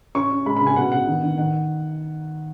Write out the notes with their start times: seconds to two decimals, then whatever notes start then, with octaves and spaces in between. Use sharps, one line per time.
0.15 C#4 C#6
0.31 C#4
0.46 G#3 B5
0.56 C#3 B5
0.66 G#5
0.76 B2 F#5
0.92 B2 F#5
1.07 D#3
1.23 D#3
1.38 D#3 F#5